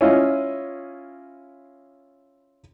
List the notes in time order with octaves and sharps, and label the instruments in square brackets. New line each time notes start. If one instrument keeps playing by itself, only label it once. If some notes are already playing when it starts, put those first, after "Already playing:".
[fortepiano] C#4 E4 F4 D#5